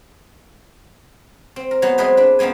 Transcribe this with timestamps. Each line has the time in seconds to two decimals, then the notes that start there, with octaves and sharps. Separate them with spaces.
1.56 C4
1.71 A#4
1.82 F#3 B3 C5
1.98 G#3 C4 G#4 B4 C5 E5
2.17 D4 B4
2.39 F#2 F3 B3 C4 G#5